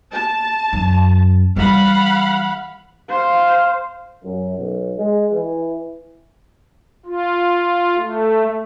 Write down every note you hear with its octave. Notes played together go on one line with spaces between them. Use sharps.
A5
F#2
E3 G3 F5 F#5 B5
C5 F5
F#2
B1
G#3
E3
F4
A3